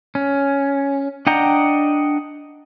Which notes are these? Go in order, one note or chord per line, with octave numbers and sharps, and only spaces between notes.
C#4
D4 D#5 F#5 G5 A#5